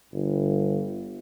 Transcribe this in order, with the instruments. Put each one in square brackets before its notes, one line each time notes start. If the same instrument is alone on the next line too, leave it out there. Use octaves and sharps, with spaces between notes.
[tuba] G1